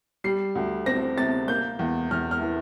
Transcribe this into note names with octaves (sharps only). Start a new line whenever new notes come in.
G3 C7
D2
C4 A#6
C3 A6
A#3 G6
E2
E2 F6
F6
E3